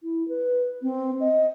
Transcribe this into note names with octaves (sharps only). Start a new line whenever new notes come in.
E4
B4
C4
D#5